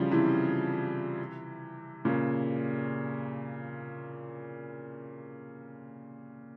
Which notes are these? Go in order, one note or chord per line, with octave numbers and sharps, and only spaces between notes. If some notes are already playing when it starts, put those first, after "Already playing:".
Already playing: C#3 E3 F3 G3
C3 E3
A#2 C#3